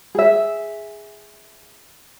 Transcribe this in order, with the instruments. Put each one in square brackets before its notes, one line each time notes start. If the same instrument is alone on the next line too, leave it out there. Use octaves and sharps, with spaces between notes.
[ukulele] G#4 E5